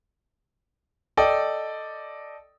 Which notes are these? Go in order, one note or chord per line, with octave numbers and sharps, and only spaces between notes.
A4 D5 D#5 G5